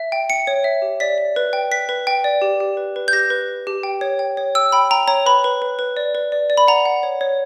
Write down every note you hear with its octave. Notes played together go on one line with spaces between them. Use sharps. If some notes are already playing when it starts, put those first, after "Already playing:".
Already playing: E5
G5
G5 C#7
C#5
E5
G4
D5 B6
D5
B4
G5
B4 B6
B4
G5
D5
G4
G4
B4
B4
G6
G4 A#6
B4
B4
G4
G5
C#5
G5
C#5
G5 E6
G5 B5
G5 A#5
C#5 A#5
B4 B5
B4
B4
B4
D5
B4
D5
D5
B5
F#5 A#5
F#5
C#5
C#5